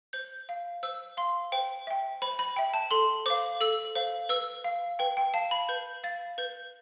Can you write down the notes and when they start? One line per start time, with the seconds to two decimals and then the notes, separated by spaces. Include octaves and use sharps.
0.13 C5 G6
0.49 F5
0.83 C5 E6
1.17 F5 C6
1.52 C5 G5
1.87 E5 G5
2.22 C5 B5
2.39 B5
2.56 E5 G5
2.74 A5
2.91 A4 C6
3.26 C5 F5 D6
3.61 A4 E6
3.95 C5 F5
4.29 B4 E6
4.64 F5
4.99 B4 G5
5.17 G5
5.34 F5 A5
5.51 B5
5.69 B4 G6
6.04 F5 A6
6.38 B4 G6